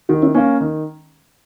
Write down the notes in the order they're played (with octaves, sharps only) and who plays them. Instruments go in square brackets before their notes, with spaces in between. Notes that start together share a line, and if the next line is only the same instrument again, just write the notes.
[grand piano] D#3 [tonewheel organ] D#4 F#4
[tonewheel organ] C#4 E4
[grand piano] A#3 C#4 [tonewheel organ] B3 D#4
[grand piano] D#3